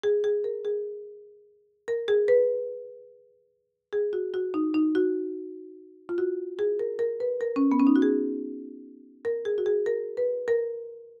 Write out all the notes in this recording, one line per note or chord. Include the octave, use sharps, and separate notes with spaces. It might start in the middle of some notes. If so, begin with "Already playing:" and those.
G#4
G#4
A#4
G#4
A#4
G#4
B4
G#4
F#4
F#4
D#4
D#4
F#4
F4
F#4
G#4
A#4
A#4
B4
A#4
C#4
B3
C#4
D#4
F#4
G#4
A#4
G#4
F#4
G#4
A#4
B4
A#4